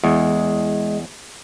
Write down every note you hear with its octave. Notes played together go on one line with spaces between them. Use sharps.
E2 G#3